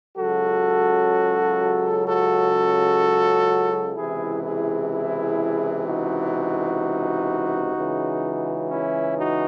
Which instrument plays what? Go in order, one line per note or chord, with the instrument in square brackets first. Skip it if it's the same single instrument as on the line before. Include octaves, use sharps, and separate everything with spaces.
[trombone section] C#2 C#3 F#3 F#4 A4
F#4 A4
C#2 C3 E3 E4 G#4
E4 G#4
E4 G#4
D#4 F#4
C#2 C#3 E3
C#4 E4
D#4 F#4